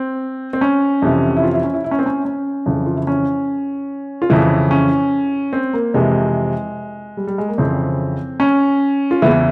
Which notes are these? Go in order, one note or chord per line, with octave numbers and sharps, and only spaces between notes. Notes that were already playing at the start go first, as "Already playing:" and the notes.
Already playing: C4
C4
C#4
F2 C3 E3
E4
F4
E4
C#4
E4
E4
C#4
C4
C#4
C#4
F2 C#3 E3
F4
E4
C#4
F4
F2 C#3 E3 E4
C#4
C4
A#3
F2 C3 E3 G#3
G3
G3
G#3
A#3
F2 C#3 E3 C4
C#4
F4
E2 C#3 E3 E4